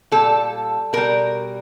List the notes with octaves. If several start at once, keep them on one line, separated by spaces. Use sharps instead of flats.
A#2 G3 A4
B2 G3 A#4